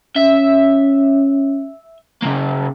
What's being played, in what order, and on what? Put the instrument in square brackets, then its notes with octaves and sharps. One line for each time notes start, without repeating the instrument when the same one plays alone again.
[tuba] C#4 [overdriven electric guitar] E5
[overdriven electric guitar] C#3 A#3